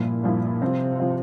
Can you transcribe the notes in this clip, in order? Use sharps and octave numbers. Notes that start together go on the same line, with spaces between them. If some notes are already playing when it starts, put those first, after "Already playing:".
Already playing: G2 A#2 F3 A#3 E4
G2 F3 A#3 E4
C3 F3 C4 F4
F3 C4 F4